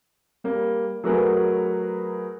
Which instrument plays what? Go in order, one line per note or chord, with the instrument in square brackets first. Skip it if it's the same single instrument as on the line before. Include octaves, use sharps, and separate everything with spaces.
[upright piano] G3 A#3
F#3 A3 F#4 G#4 A#4 B4